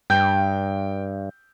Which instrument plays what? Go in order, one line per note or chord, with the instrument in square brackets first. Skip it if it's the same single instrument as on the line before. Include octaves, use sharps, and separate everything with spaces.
[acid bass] G2 [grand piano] G5 G6